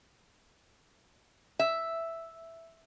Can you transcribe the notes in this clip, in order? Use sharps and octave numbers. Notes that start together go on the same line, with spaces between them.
E5